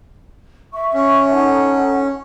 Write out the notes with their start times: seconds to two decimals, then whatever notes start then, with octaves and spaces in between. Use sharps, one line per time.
0.72 E5 C#6
0.94 C#4
1.31 D#4 A4 F#5